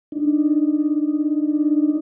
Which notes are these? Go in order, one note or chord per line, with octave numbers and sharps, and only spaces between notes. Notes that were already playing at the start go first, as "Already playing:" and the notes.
D4 D#4